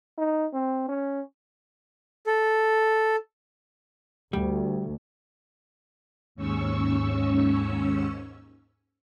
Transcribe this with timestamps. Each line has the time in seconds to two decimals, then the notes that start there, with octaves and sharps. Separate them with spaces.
0.18 D#4
0.53 C4
0.89 C#4
2.27 A4
4.33 D2 G3
6.35 D#2 G#2 C#4 C#6 E6